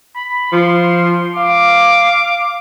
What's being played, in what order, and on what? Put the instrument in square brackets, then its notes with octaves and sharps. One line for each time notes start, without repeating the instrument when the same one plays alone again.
[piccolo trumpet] B5
[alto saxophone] F3 [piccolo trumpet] C6
[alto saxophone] F5 [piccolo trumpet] D6